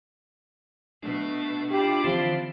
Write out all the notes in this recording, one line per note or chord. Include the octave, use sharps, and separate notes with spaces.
B2 A3 D4
E4 F4 G4 D5
D3 E3 F3 C4